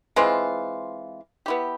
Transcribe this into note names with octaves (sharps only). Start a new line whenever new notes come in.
E3 G#3 C4 F4
B3 E4 G4